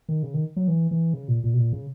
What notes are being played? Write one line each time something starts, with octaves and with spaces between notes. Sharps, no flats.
D#3
C#3
D#3
F#3
E3
E3
C#3
A#2
A#2
B2
A#2
C#3